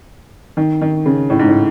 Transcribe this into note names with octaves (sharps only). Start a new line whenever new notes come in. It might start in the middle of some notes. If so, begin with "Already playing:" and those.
D#3
D#3
C#3
A2
G#2
A2